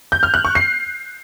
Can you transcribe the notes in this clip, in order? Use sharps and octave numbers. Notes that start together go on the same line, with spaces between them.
G6
F6
F#6
C#6
C7